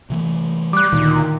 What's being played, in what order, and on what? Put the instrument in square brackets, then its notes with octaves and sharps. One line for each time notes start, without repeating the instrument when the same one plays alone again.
[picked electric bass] C3 E3 A3
[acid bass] G3 [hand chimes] D6 F#6
[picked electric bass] D2 [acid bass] A#2 [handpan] D#3